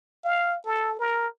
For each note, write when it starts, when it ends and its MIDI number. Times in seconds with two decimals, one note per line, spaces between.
0.24 0.57 77
0.65 0.96 69
0.99 1.27 70